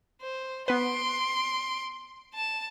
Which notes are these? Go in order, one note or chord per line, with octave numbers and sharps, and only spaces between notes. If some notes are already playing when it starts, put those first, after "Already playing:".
C5
B3 B4 C6 D7
A5 E7